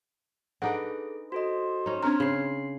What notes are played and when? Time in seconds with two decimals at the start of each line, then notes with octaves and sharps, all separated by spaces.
0.62 D4 D#4 G#4 A4 B4 F#5
1.32 F#4 A4 C5 D#5
1.86 C#4 D#4
2.03 C4 D4 A#5 F6 G#6
2.20 C#3 C6 C7